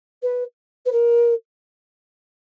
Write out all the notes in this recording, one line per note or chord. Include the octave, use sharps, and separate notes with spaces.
B4
B4
A#4